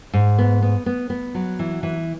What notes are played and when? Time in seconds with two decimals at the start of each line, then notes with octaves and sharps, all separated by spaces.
0.13 G#2
0.39 B3
0.62 B3
0.86 B3
1.10 B3
1.35 F#3
1.59 E3
1.83 E3